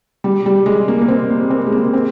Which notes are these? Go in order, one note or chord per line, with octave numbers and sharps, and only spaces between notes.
G3
G3
G#3
A#3
A#3
C4
A#3
C4
G#3
A#3
C4